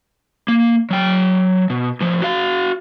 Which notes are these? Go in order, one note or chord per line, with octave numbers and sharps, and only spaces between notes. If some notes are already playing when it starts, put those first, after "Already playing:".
A#3
F#3 G5
B2
A2 F3
F#4 F5